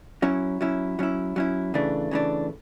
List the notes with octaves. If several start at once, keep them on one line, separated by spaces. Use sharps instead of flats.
F#3 C#4 E4
F#3 C#4 E4
F#3 C#4 E4
F#3 C#4 E4
C#3 E3 A3 D4
C#3 E3 A3 D4